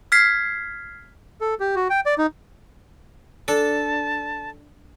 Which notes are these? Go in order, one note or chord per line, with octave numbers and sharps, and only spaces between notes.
F6 G#6 B6 C7
A4
G4
F#4
G5
D5
D#4
D4 A4 A5